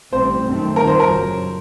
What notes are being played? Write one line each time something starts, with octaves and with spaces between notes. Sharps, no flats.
A1 A2 G3 C4 C5
F#2 D#3 A3 C4
D#2 D#3 G3 A#4
C5
A#4
F#1 F#2 F#3